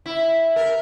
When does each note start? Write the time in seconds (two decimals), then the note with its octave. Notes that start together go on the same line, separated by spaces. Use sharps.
0.06 E4
0.56 A#4